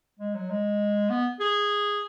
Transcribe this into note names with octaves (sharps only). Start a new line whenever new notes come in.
G#3
F#3
G#3
B3
G#4